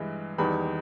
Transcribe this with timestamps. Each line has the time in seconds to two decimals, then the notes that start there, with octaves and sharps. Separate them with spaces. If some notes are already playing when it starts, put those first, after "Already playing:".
Already playing: G2 E3 G#3
0.38 E2 D#3 G3 B4 B5